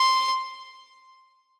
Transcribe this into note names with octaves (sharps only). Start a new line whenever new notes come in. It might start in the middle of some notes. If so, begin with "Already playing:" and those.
Already playing: C6